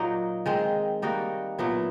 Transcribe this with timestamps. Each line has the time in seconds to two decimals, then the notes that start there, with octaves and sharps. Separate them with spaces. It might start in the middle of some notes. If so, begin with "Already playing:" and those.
Already playing: A#2 F#3 A#3 D#4
0.46 D#3 G#3 C4
1.02 G3 A#3 D#4 F#4
1.59 A#2 F#3 B3 E4